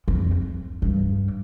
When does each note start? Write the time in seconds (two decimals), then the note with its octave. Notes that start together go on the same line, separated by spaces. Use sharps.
0.08 F2
0.82 G2